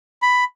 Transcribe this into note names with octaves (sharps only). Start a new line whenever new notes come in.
B5